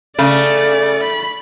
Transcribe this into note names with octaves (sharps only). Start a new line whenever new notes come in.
C#3 A3 D5
B5